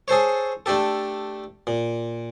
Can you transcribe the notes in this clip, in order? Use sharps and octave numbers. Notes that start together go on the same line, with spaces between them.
G#4 A4 C5 C#5
A3 D4 G4 A4
A#2